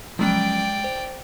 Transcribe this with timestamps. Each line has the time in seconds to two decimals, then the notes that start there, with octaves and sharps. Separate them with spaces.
0.19 F#1 F3 F#3 G#3 C#4 D5 G5
0.84 C5